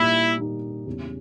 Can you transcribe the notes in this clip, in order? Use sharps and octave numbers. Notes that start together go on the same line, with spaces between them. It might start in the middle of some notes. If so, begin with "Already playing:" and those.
Already playing: A#2 G3 A#3 D#4 E4
A#2 G3 A#3 D#4
E2 C#3 G3 C#4